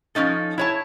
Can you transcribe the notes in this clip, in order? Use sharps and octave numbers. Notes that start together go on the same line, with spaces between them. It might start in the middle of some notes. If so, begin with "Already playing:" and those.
F3 A3 C#4 D#4 A4
E4 C#5 A5